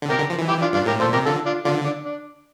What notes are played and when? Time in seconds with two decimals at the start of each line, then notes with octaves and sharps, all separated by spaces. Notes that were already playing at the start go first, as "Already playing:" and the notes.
0.02 D3
0.09 C3 G4 A#4
0.19 D3
0.30 F3
0.39 E3
0.48 E4 G4
0.61 D4 F4
0.73 G2 D4 F4
0.86 A2 G4 A#4
1.00 A#2 A4 C5
1.13 C3 G4 A#4
1.26 D3 F4 A4
1.46 D4 F4
1.65 D3 D4 F4
1.85 D4
2.04 D4